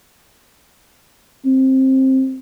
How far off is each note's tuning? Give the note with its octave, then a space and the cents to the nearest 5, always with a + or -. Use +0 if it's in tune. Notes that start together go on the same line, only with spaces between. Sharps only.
C4 +15